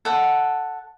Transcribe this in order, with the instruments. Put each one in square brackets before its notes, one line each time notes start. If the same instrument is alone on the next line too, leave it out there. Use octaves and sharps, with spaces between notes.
[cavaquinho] A4 F#5